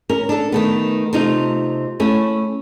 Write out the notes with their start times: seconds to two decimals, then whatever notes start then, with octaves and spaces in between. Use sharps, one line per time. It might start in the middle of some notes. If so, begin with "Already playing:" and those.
0.09 C#4 A#4
0.29 D4 A4
0.52 D#3 A3 B3
1.13 C3 A3 D#4 F4
2.00 A3 C#4 E4